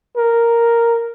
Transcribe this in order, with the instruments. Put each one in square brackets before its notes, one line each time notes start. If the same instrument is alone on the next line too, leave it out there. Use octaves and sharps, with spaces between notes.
[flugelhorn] A#4